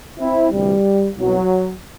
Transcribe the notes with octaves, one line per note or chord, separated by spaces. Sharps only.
C4 E4
D2 C3 E3 G3
C2 B2 F#3